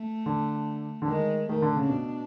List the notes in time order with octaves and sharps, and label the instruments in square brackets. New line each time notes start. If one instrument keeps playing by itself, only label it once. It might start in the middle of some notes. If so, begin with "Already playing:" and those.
Already playing: [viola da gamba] A3
[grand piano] D3
D3
[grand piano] D#3 [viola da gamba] G#3
[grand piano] D#3 [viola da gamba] A3
[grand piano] D3
C#3
[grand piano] B2 [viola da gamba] D4